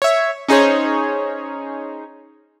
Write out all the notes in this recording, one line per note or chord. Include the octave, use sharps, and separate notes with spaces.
C#5 E5
C#4 D#4 G#4 C5 C#5